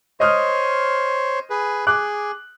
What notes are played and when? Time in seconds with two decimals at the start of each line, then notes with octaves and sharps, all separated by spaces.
0.20 C5 C#5 D#5 D#6 F6
1.50 G#4 B4
1.87 G#4 D6 F#6